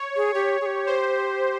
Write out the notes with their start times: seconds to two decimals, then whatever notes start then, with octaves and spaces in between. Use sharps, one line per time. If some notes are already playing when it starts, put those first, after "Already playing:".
Already playing: C#5
0.16 G#4
0.34 G4 C#5
0.61 G#4
0.66 G4
0.87 C5